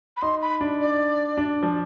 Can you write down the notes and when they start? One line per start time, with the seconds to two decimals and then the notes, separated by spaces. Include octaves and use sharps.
0.17 B5
0.22 D#4 C6
0.42 B5
0.61 D4
0.80 D5
1.37 D4
1.63 F3